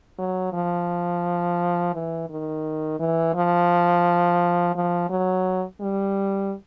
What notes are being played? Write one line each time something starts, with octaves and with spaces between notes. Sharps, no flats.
F#3
F3
E3
D#3
E3
F3
F3
F#3
G3